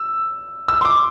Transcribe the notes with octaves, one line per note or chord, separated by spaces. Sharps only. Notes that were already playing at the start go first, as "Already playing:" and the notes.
Already playing: E6
E6
C6
D6